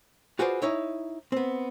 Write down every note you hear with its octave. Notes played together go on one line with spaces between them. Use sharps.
F4 F#4 G#4 B4 C5 D5
D#4 E4 C#5 E5
B3 C4